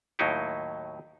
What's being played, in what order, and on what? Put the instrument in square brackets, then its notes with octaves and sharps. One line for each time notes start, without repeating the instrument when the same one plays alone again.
[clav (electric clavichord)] D#2 A2 F#3 D#4 E4